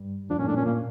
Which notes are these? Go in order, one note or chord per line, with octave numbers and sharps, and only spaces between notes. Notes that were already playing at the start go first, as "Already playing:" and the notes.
Already playing: G2 G3
F2 F3 D4
A#2 C#4
A2 D4
A#2 C#4
A#3